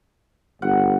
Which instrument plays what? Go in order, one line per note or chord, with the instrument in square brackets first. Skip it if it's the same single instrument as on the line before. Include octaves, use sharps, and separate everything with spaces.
[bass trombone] G1 [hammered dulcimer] F#5